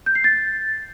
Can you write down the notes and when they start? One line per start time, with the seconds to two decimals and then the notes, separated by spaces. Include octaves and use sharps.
0.06 G6
0.15 C7
0.24 A6